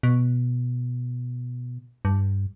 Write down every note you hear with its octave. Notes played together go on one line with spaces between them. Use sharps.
B2
G2